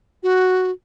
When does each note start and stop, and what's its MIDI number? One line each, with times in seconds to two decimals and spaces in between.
0.23 0.71 66